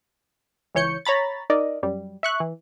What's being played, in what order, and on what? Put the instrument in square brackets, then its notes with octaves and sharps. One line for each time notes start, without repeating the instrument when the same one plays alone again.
[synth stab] C#2 E3 C#5 G6 C#7
C#5 A#5 B5 A6
D#4 A#4 D5 D#5
F#2 G3
E5 C#6 F#6
E3